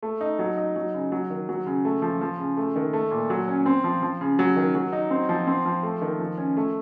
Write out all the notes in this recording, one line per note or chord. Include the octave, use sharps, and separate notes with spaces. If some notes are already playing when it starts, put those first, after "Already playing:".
A3
D#4
F#3
D#4
F#3
C#3
F#3
D#3
F#3
C#3
A3
F3
F3
C#3
A3
D#3
A3
A#2
F#3
C#4
C4
F3
F3
C#3
F#3
D#3
F#3
D#4
C4
F3
C4
F3
A3
D#3
F3
C#4
A3